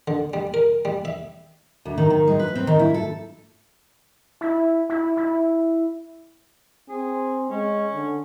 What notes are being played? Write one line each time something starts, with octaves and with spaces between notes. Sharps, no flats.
D3
G3
A#4
G3
E5
D2
D#3
D#3
G#3
B4
C4
D#3
E4
A4
E4
E4
E4
C4 G#4
G#3 C#4
D3